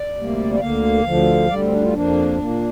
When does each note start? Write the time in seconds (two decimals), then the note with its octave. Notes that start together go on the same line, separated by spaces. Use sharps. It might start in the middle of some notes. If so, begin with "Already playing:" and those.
Already playing: D5
0.15 D2 C3 G3 A#3
0.55 D5
0.60 D2 D3 A#3 F5
1.05 D2 D3 F3
1.49 D2 D3 G3 D5
1.61 C4
1.71 D4
1.82 F4
1.93 F2 F3 A#3 D4
2.38 A#2 A#3